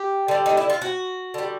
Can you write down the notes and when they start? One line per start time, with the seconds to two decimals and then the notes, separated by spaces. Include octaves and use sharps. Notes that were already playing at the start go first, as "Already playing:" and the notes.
Already playing: G4
0.28 D3 G3
0.46 D#4
0.57 E4
0.70 F4
0.82 F#4
1.34 D3 G3